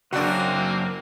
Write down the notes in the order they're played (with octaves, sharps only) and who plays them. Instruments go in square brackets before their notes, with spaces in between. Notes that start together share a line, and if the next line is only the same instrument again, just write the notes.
[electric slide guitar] F#2 C#3 [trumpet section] A#3 C4 [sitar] D4 F#4